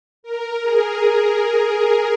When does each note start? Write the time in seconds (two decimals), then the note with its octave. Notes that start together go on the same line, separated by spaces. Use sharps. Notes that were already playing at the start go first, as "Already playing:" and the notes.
0.23 A#4
0.63 G#4